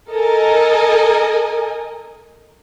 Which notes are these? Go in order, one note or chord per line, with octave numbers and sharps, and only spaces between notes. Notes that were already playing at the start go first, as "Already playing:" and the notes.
A4 A#4 D#5 G#5